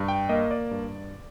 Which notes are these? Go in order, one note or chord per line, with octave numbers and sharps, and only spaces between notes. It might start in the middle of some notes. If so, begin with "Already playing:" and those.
Already playing: G2
G5
A#3 D#5
D5
G2